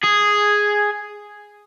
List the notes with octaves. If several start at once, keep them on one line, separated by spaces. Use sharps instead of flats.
G#4